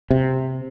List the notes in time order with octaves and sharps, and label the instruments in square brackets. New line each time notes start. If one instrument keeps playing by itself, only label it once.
[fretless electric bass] C3